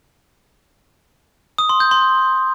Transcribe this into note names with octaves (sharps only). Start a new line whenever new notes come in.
D#6
C6
G6
C6